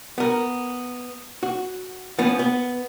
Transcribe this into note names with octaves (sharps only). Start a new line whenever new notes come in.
B3 A#4
F#4
F3 B3 C#4
B3